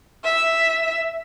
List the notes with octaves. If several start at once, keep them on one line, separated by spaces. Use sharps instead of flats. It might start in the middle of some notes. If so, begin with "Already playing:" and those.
E5